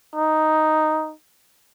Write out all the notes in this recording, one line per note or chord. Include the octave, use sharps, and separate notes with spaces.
D#4